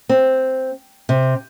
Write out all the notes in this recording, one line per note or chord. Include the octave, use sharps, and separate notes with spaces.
C4
C3